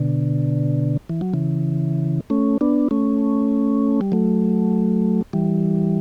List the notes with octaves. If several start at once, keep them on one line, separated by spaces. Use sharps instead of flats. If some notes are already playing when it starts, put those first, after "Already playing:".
Already playing: B2 D3
E3
F#3
C#3 E3
A3 C#4
B3 D4
A3 C#4
G3
F#3 A3
E3 G3